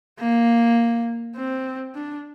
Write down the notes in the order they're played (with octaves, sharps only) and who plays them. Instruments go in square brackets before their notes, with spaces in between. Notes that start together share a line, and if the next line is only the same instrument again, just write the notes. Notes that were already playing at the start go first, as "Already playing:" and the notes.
[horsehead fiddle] A#3
C4
D4